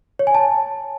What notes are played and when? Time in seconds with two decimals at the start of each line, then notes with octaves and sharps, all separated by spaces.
0.19 C#5
0.27 G#5
0.35 A5